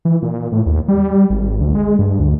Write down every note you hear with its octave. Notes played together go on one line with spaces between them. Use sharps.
E3
A#2
A2
D#2
G3
G#1
D2
G#3
G2
D2